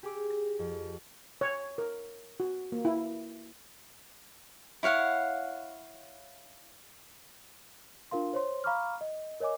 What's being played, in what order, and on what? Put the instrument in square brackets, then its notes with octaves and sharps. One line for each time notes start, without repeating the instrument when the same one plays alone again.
[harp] G4 G#4 D6 E6
A#6
F2
[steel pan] C#5
A#4
F#4
A#3
E4
[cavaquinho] E4 C#5 F5 F#5
[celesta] D4 F4 A#4 F5 C6
C5 C#5 C6
F5 A#5 B5 C#6 D6 F6
D#5
A#4 C#5 D#5 G#5 D6